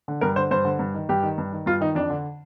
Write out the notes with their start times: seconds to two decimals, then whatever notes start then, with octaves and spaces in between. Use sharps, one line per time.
0.08 D3
0.21 G2 A#4
0.36 D3 C5
0.51 G2 C5
0.65 D3
0.79 G2
0.94 D#3
1.09 G2 G4
1.23 D#3
1.38 G2
1.52 D#3
1.66 G2 F4
1.81 D#3 D#4
1.95 F2 D4
2.10 D3